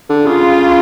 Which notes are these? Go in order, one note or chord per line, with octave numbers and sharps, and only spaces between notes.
D3
C#3 F4